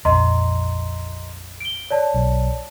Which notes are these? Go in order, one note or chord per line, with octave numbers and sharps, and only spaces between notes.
A#1 F2 D#5 A#5 C6
D7 G7
C#5 D5 A5
B1